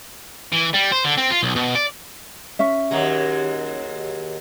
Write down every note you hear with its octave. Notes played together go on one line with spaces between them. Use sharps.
E3
G3
C5
D3
C4
F4
B1
B2
D5
C#4 E5
D#2 F#3 G#3